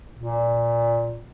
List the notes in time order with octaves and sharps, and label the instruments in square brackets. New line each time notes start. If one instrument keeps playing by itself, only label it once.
[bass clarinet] A#2